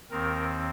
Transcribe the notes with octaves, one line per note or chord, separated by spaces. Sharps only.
D#2 D#3 C4 A#4